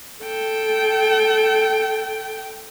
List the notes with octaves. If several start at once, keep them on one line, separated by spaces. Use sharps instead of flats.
A4 G5